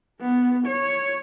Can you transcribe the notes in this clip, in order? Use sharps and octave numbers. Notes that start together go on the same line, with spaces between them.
B3
C#5